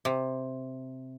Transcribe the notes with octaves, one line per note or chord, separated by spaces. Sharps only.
C3